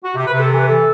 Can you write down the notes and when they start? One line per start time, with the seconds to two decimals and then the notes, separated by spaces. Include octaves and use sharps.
0.04 F#4
0.15 C3 G4
0.27 B4
0.33 C3
0.39 A4
0.51 E3 A4
0.58 B4
0.66 E3 A4